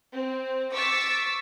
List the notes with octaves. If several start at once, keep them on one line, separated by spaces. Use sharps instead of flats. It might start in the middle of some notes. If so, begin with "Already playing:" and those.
C4
C#6 D6 E6 A6 B6